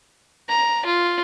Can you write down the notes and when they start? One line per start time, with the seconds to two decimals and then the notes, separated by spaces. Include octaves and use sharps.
0.49 A#5
0.86 F4